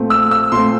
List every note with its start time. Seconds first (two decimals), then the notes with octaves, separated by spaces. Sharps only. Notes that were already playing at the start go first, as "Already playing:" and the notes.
Already playing: A#2 A3 C4
0.10 E6
0.31 E6
0.52 A#2 A3 C4 C6